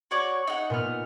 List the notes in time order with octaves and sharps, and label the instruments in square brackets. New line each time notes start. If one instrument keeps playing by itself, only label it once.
[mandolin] F#4 C#5 D5
D#4 F#5
[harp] A#2 B3 F6